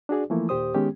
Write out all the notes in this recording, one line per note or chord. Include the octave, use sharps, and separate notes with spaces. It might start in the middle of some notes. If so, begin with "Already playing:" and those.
D4 F#4 G#4 D5
E3 F3 A3 A#3 E4
D#2 A#2 G4 C5 D#6
D#3 G#3 B3 C#4 G4